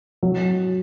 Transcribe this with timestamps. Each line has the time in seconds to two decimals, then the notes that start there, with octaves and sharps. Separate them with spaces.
0.23 F#3